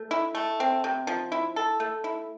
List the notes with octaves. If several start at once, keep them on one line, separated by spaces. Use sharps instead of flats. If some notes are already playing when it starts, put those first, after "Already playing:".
Already playing: A3
E4
A3
C4
C3
F3
E4
A4
A3
E4